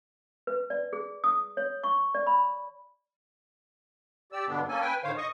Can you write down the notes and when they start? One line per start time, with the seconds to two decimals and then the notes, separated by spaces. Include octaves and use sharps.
0.47 B4
0.70 D5
0.93 G#4
1.24 D#6
1.57 C#5
1.83 C#6
2.15 D5
2.27 B5
4.32 G4 D5 E6
4.48 G2 B2 D3 B3 D4
4.68 A#3 C#4 A4 G#5
4.81 B4 G5 G#5
5.04 A2 D3 D#3 C5 C#5 F5
5.17 D#5 C#6 D#6